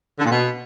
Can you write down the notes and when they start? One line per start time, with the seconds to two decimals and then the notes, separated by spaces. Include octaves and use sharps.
0.19 D3
0.25 A#2
0.30 B2